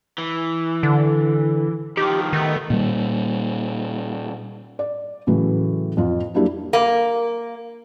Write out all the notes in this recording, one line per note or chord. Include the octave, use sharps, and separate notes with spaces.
E3
D3
D#3 F3 G4
D#3 A3 B3
A#2 G3
D5
A2 C#3 E3 F#3 A3
F2 C4 F4
F#3 G3 A#3 D4 E4 G4
A#3